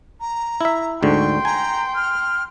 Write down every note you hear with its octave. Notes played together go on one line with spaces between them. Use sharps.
A#5
E4 E5
D2 G#2 D3 G5 C6 C#6
G#5 A#5
F6